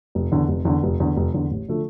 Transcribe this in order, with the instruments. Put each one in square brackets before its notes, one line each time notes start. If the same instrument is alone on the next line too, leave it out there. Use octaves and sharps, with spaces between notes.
[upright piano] F1
E2 D3
F1
E2 D3
F1
E2 D3
F1
E2 D3
A1
D3 F3 A3